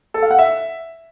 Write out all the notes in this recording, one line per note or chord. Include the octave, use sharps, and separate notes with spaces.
A4
F5
F#5
E5